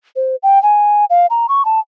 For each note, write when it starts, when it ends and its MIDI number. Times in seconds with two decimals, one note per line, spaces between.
0.16 0.36 72
0.43 0.61 79
0.63 1.05 80
1.10 1.26 77
1.30 1.47 82
1.49 1.65 85
1.65 1.80 81